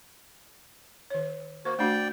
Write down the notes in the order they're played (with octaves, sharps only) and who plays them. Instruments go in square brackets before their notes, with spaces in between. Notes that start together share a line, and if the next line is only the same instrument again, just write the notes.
[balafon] D#3 C#5
[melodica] A#3 F#4 [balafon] C5
[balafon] A3 D4 F#4 [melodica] D5 G5